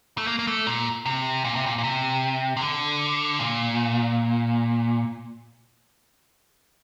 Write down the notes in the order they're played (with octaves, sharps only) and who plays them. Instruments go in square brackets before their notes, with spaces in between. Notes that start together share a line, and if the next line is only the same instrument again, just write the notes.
[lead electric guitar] A3
A#3
A#3
A3
A#2
C3
A#2
C3
A#2
A#2
C3
C3
D3
A#2